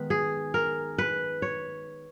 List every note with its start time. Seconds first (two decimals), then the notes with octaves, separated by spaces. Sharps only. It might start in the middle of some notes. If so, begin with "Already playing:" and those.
Already playing: D#3 G#3 B3 B4
0.10 G#4
0.54 A#4
0.98 B4
1.42 C#5